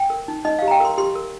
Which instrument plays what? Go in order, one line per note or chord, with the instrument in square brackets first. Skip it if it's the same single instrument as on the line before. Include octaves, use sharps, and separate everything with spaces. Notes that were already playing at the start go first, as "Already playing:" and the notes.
Already playing: [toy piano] G5
A#4
D#4
D#4 D#5
G4 F5
A#5
G5
A#4 C6
G4 C6
A#4